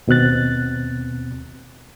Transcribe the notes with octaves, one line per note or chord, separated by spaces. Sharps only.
D#2 B2 C4 F#6 A6